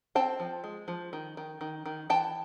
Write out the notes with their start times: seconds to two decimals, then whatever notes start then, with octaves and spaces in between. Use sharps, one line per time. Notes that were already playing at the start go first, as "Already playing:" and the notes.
0.15 C4 G5 A5
0.40 F3
0.64 G#3
0.88 F3
1.13 D#3
1.37 D#3
1.61 D#3
1.86 D#3
2.10 E3 G5 A5